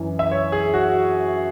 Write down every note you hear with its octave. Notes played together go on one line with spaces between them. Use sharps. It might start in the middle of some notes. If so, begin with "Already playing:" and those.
Already playing: F#2 E3
E5
C#5
G#4
F#4